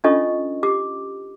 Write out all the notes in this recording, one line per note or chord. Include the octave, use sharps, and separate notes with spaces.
C#4 D4 F4 A4 D#5 C#6
G4 D6